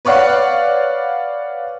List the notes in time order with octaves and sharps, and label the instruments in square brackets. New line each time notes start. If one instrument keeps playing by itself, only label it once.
[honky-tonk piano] B4 C#5 D5 F5 F#5